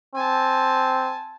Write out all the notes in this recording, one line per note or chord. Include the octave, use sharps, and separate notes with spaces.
C4 G#5 A5